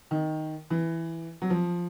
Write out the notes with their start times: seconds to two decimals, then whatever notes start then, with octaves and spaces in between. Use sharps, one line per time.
0.11 D#3
0.70 E3
1.42 F#3
1.50 F3